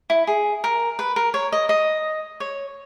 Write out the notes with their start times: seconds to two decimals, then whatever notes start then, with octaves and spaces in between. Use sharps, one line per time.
0.10 E4
0.27 G#4
0.64 A#4
0.99 B4
1.16 A#4
1.34 C#5
1.52 D#5
1.69 D#5
2.40 C#5